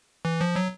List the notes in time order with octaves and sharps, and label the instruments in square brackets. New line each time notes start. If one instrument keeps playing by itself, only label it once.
[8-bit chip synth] E3
F3
F#3